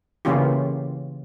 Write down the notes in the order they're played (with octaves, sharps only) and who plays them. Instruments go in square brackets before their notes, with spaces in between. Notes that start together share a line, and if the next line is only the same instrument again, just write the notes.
[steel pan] C#3 E3 A#3 C#4 F4 G4